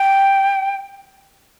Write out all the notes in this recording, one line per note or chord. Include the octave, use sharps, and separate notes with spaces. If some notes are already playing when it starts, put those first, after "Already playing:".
Already playing: G5